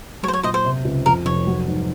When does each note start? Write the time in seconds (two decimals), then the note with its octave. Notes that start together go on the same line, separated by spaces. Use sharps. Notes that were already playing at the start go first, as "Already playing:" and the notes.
0.23 F#3 C#5
0.28 C5
0.33 C#5
0.43 A#2 C5 D#5
0.54 C5
0.64 C3
0.85 C#2
1.06 F2 A#4
1.26 F1 C#5
1.47 F#3
1.67 G#2